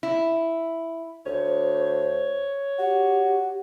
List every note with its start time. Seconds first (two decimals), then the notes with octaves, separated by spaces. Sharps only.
0.03 E4
1.26 D2 C5 C#5
2.79 F#4 G4